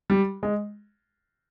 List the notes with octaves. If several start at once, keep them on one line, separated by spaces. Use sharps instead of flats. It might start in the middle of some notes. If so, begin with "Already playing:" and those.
G3
G#3